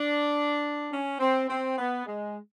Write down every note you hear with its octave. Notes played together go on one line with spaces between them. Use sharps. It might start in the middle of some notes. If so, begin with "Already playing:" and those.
Already playing: D4
C#4
C4
C4
B3
G#3